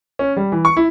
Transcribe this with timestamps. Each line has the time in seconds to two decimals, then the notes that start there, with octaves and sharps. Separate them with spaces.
0.19 C#4
0.37 G3
0.52 E3
0.65 C#6
0.77 E4